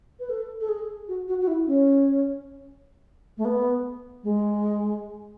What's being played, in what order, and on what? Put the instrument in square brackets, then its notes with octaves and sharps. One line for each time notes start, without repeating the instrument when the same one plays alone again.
[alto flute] B4
A4
A4
G#4
F#4
F#4
F#4
E4
C#4
A3
B3
G#3